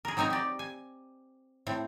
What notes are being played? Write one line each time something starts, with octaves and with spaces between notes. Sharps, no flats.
G#4 A#4
F#3 C4 D#4 G#5 A#5
G4 D5
G#5
A2 C4